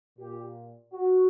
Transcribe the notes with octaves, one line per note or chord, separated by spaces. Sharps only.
A#2 G4
F#4